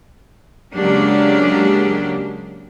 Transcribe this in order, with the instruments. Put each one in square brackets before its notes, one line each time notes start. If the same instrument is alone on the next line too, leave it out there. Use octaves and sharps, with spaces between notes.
[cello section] C#3 F#3 G#3 A#3 D4 G4